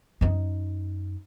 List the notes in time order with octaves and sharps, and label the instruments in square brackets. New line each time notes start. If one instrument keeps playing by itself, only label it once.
[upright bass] F#2 D#4